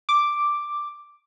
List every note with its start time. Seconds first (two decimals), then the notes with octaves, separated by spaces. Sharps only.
0.09 D6